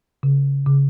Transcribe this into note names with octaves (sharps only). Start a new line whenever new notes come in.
C#3
C#3